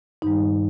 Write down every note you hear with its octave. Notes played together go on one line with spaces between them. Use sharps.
G2 D#3 G3 D#4